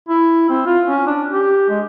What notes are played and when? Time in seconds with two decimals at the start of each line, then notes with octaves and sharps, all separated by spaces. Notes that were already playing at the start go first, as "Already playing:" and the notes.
0.09 E4
0.50 C4
0.66 F4
0.87 C#4
1.07 D4
1.30 G4
1.69 G#3